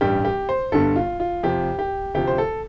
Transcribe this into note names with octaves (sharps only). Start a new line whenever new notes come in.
A1 G2 G3 G4
G4
C5
G1 G2 D3 G3 A4
F4
F4
F2 C3 F3 G4
G4
D2 C3 F3 G4
C5
A4